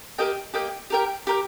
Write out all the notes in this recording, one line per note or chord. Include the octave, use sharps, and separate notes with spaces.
A#3 G4 D#5 G5
A#3 G4 D#5 G5
G4 A#4 G5
G4 A#4 G5